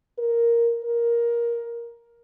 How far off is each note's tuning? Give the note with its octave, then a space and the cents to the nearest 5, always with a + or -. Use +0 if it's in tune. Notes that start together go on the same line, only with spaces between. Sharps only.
A#4 +0
A#4 +10